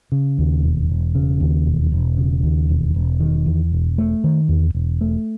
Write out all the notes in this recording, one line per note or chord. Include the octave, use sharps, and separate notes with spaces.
C#3
D#2
E1
E1
C#3
D#2
E1
E1
C#3
D#2
E1
E1
D#3
E2
E1
A3
D#3
E2
E1
A3